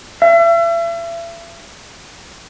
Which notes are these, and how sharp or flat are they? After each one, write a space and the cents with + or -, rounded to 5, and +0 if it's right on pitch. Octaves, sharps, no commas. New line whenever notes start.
E5 +40